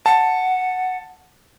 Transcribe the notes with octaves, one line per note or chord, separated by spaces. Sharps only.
F#5 A5